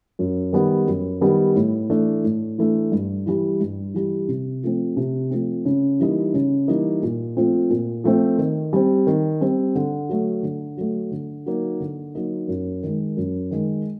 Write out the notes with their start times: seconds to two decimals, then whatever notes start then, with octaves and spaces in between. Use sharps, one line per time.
0.19 F#2
0.53 D#3 G3 B3
0.87 F#2
1.21 D#3 G3 B3
1.56 A2
1.90 E3 A3 D4
2.24 A2
2.58 E3 A3 D4
2.92 G2
3.26 E3 G3
3.61 G2
3.94 E3 G3
4.28 C3
4.63 F3 A3 C4
4.97 C3
5.31 F3 A3 C4
5.65 C#3
6.00 E3 G3 A#3 D#4
6.34 C#3
6.68 E3 G3 A#3 D#4
7.03 A#2
7.36 F3 A3 C4 F4
7.70 A#2
8.04 F3 A3 C4 F4
8.38 D#3
8.73 G3 C4
9.07 D#3
9.41 G3 C4
9.75 D3
10.09 F#3 A3
10.43 D3
10.77 F#3 A3
11.12 D3
11.46 F#3 A#3 D#4
11.80 D3
12.15 F#3 A#3 D#4
12.48 F#2
12.83 D#3 G#3
13.17 F#2
13.51 D#3 G#3